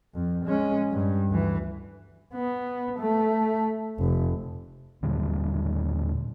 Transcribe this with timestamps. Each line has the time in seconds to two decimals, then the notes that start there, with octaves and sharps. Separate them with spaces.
0.14 F2
0.45 G#3 C#4
0.91 G2
1.28 D2 E3
2.34 B3
2.99 A3
3.99 F1
5.02 D#2 A#2 D3 G3